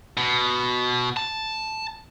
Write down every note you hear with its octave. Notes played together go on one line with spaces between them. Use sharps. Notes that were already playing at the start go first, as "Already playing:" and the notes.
B2
A5